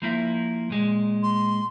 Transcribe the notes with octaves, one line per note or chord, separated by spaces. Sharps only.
F3 A#3 E4
A#2 G#3
C6